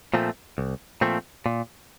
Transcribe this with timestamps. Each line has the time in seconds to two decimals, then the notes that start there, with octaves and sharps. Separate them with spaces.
0.14 A#2 F3 A3 C4
0.58 C2
1.01 A#2 F3 A3 C4
1.46 A#2